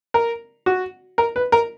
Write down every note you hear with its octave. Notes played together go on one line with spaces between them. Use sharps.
A#4
F#4
A#4
B4
A#4